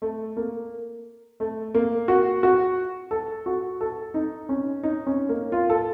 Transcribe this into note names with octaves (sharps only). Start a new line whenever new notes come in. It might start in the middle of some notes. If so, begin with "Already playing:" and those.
A3
A#3
A3
A#3
F#4
F#4
A4
F#4
A4
D#4
C#4
D#4
C#4
A#3
F4
A4